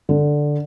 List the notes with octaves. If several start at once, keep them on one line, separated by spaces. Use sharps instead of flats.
D3